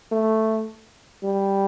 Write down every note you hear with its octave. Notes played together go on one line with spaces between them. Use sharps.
A3
G3